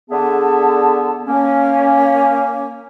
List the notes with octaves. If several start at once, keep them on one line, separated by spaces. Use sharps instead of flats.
D3 B3 G#4 E5 A5
A#3 C#4